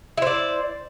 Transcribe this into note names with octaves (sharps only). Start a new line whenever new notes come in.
E4 C5 D5